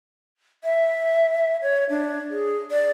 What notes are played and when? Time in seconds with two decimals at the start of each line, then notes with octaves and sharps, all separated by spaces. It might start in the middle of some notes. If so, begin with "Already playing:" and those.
0.64 E5
1.62 C#5
1.90 D4
2.30 G#4
2.71 D5